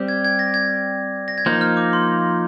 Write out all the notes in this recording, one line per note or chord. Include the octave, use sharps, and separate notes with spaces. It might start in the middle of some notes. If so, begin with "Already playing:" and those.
Already playing: G3 C4 G4
G#6
G#6
A#6
G#6
A#6
G#6
F3 A#3 D#4 G6
F6
D6
C6